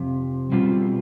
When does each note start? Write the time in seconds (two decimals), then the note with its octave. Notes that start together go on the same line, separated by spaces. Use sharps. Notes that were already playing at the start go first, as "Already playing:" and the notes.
Already playing: F2 C3
0.52 B2 G3 C4 F4